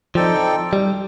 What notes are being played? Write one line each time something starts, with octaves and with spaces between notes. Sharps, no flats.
F3 C4 D#4 A4 D5 G5
G3